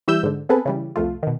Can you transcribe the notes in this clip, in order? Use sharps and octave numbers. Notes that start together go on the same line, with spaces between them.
E3 G3 E5 E6 G6
G#2 D3
B3 C4 G#4 A4 B4
C#3 E3 G3
C2 F2 A3 F4
B2 D#3